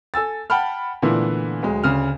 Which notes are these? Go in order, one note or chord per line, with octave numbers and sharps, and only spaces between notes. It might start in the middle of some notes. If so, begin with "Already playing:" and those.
A4 G#5 E6 A6
F#5 G5 A5 B5 F6
A#2 D3 E3 A3 B3 E4
D2 F#3 G#3
D2 C#3 F6